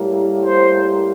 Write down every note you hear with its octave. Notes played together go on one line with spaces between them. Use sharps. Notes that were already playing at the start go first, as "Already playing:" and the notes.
Already playing: A2 G3 A#3
C5